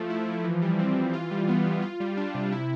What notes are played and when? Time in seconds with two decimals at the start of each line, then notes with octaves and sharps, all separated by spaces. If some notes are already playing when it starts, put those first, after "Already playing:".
Already playing: F3 A3
0.10 E4
0.27 F3
0.44 E3
0.62 G3
0.79 C4
0.96 E3
1.13 F4
1.31 G3
1.49 B3
1.66 E3
1.82 F4
2.00 G3
2.17 D4
2.35 C3
2.52 E4